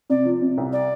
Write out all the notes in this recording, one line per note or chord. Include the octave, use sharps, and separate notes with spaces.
C3 D5
F3
C3
C2
D5